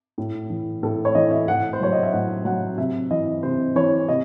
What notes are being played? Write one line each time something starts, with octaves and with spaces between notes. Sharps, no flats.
A2
E3
A2 A4
C#5
E3 D#5
E5
A2 F#5
C5
F#3 C#5
D#5
E5
A2 F#5
F#3 F#5
C3 E5
E3 D#5
C3 C5
E3 C#5
C3 D#5